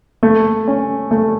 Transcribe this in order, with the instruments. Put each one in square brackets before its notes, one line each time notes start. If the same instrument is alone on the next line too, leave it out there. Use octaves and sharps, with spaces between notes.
[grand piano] A3
C#4
A3